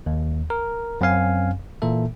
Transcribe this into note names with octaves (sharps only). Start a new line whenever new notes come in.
D#2
A#4
F#2 C4 C#4 F5 G#5
A#2 E3 A#3 A4 E5